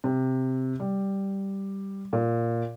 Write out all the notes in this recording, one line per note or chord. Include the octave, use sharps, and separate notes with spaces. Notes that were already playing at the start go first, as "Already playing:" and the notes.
C3
G3
A#2